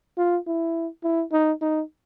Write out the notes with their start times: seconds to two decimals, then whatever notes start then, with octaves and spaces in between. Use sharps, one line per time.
0.18 F4
0.47 E4
1.04 E4
1.32 D#4
1.62 D#4